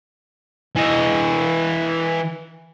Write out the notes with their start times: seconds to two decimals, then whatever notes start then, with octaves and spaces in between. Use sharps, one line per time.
0.76 E3 D#5